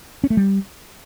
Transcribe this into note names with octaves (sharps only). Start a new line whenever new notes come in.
C#4
A3
G3